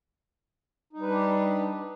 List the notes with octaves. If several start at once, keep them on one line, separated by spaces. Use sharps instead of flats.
G3 D4 D#4 G4 B4